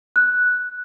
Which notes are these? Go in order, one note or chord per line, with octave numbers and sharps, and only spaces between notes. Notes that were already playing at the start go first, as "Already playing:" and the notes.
F#6